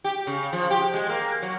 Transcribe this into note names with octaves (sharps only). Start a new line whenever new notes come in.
G4
C#3
F3
G4
G#3
A#3
F#3